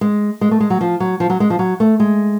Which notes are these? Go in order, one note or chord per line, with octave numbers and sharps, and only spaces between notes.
G#3
G#3
A3
G#3
F#3
F3
F#3
F3
F#3
G#3
F3
F#3
A3
G#3